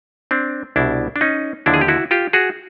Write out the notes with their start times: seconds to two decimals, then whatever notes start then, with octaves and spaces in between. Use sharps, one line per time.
0.31 C4 D4
0.76 C2 B2 G3 D4 E4
1.16 D4
1.21 C#4 D#4
1.66 D#2 D3 F3 D4 E4
1.74 G#4
1.81 G4
1.88 E4 F#4
2.11 F4 G4
2.33 F#4 G#4